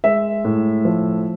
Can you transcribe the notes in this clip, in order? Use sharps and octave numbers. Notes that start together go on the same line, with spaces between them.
G#3 E5
A2
F3